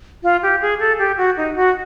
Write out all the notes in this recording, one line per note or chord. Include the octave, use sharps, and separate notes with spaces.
F4
G4
G#4
A4
G4
F#4
D#4
F#4